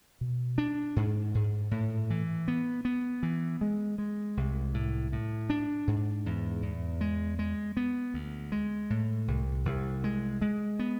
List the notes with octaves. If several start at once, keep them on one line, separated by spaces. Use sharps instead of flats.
B2
D4
G#2
G#2
A2
E3
B3
B3
E3
G#3
G#3
C2
A2
A2
D4
G#2
E2
E2
G#3
G#3
B3
D2
G#3
A2
C2
C2
G#3
G#3
B3